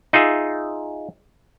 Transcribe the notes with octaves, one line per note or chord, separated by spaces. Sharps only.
D#4 F4 G#4 E5